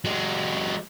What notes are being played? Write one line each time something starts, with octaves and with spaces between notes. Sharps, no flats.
F#3 G#3